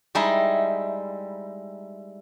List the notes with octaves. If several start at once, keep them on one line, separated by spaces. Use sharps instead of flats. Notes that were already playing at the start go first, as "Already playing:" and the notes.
G3 G#3 D#4 E4